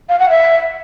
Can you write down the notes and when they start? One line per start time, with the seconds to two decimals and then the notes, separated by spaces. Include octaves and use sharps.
0.09 F5
0.19 F#5
0.30 E5